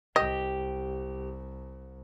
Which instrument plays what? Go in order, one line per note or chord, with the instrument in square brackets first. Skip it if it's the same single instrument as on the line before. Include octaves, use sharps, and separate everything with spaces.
[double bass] C2 [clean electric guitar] G4 [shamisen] D#5